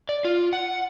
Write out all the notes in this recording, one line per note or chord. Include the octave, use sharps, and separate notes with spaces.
D5
F4
F#5